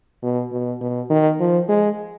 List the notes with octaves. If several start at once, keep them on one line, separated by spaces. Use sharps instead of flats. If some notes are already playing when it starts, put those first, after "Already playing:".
B2
B2
B2
D#3
F3
G#3